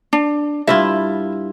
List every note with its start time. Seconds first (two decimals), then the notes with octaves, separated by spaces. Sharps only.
0.13 D4
0.67 G2 E4 F4 E5